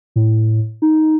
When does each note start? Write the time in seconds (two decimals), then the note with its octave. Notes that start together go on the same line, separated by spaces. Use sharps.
0.16 A2
0.82 D#4